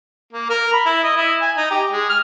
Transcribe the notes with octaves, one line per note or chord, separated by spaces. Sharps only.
A#3
A#4
B5
E4
D#5
E4
G#5
D#4
G4
G#3
F6